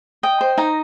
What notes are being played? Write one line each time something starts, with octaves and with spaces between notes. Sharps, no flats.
D#5 G5
C5
D#4 A#5